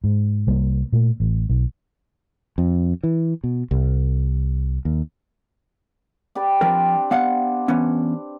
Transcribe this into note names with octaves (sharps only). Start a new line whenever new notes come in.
G#2
C2 G3 A#3
A#2 A3
A1
B1
F2
E3
B2
C2
D#2
G4 B4 D5
F3 C4 D4 A#4
B3 F5 F#5
E3 B3 C#4